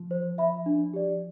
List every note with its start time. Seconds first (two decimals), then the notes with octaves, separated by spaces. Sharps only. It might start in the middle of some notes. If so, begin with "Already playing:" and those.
Already playing: F3
0.11 C5
0.38 E5 B5
0.66 D4
0.94 G4 D5